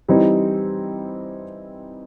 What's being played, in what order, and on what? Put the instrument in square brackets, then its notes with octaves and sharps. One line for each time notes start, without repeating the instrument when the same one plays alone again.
[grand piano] E3 G3 C4 D#4